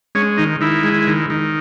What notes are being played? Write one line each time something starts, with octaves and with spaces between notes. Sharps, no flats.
G#3 C#4
D#3 D#4
D#3 E4
G#3
D#3
D#3